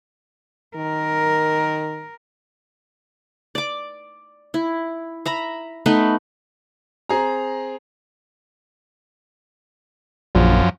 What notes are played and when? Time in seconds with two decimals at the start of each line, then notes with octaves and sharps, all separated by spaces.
0.76 D#3 A#4
3.55 D5 D6
4.54 E4
5.26 E5 A#5 B5
5.86 A3 B3 D#4 B4
7.09 C4 G#4 A#5
10.35 A#1 F#2 F3